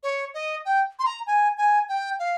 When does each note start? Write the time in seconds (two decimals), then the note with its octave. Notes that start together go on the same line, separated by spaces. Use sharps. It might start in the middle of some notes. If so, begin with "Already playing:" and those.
0.03 C#5
0.34 D#5
0.65 G5
0.99 C6
1.06 A#5
1.27 G#5
1.57 G#5
1.89 G5
2.19 F5